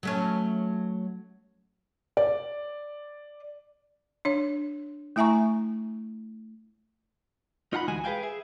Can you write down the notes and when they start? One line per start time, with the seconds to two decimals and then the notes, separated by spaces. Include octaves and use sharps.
0.03 F#3 A3 C#4
2.17 D5
4.25 D4 C#5
5.16 A3 E4 E5 G#5 A#5 C#6
7.73 D#4 F4 F#5 A5 B5
7.88 D2 E3 G#3 F#4 D#5 G#5
8.04 G#4 B4 D#5 F5 G5 G#5
8.23 G#4 E5